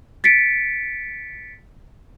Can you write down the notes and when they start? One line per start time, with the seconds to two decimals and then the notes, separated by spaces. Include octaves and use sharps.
0.24 A6 B6 C#7 D7